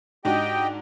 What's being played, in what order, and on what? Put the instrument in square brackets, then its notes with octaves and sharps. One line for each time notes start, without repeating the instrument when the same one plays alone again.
[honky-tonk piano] G#2 D4 F#4 [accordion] G4 D#5 G5